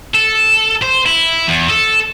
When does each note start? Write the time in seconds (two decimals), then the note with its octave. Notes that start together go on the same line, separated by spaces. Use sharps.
0.15 A4
0.82 C5
1.06 E4
1.48 E2
1.70 A4